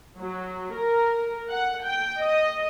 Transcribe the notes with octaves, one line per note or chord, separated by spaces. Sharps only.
F#3
A#4
F#5
G5
D#5